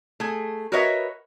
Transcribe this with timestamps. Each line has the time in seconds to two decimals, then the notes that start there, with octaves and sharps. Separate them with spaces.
0.20 A3 G#4
0.72 F#4 A#4 B4 C#5 D#5 E5